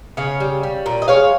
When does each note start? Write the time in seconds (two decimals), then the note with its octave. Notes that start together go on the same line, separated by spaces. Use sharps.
0.17 C#3 C#5 F5
0.40 G3
0.63 G3
0.86 A#2
1.02 D#5
1.08 G#3 C#5 F5